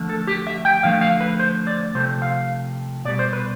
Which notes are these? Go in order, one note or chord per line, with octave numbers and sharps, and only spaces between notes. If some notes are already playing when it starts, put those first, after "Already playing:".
Already playing: D3 F3 A3
A4
G4
E5
G5
D3 F3 A3 F5
F5
B4
C5
D5
C3 F3 A3 C5
F5
B2 G3 D5
C5
B4